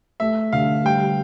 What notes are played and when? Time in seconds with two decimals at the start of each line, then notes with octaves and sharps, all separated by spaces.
0.20 A3 E5
0.53 D3 F5
0.85 G3 G5